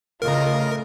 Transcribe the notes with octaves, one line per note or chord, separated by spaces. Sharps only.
C#3 A3 F4 A#4 D#5